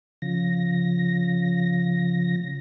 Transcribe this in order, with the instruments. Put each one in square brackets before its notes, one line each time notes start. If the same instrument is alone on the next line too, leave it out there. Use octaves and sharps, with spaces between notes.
[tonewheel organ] C#3 F3 A#6